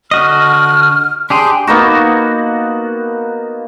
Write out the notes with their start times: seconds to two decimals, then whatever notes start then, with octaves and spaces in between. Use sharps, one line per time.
0.11 D3 F#4 D#5 F6
1.30 D4 G4 G#4 C6
1.67 A#3 B3 D#4 F#4